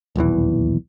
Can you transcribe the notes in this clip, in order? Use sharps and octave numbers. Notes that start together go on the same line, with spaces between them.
D#1 B1 E2 E3